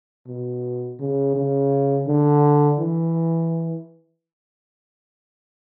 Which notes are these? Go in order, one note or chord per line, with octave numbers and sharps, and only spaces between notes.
B2
C#3
C#3
D3
E3